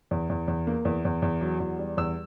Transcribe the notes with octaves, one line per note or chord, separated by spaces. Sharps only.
E2
E2
E2
A#3
E2
E2
E2
F#3
E2
G3
E2 E6